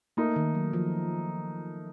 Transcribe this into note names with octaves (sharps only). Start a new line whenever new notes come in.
A3 A#3 D#4 A#4
D#3
F#3
F3